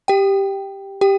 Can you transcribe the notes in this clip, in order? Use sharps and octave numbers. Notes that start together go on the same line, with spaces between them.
G4 G5
G4 G5